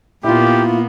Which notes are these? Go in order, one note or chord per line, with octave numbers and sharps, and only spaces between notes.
A#2 A#3 B3 E4 F4 G4